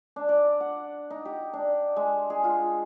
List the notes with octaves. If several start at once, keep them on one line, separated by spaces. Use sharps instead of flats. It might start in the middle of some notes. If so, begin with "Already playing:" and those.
D4
D5
F#5
D#4
G4
D4
G#3
G#4
F4